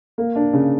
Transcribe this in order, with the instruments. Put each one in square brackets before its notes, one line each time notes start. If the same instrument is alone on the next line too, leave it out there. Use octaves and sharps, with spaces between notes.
[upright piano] A#3
D4
C#3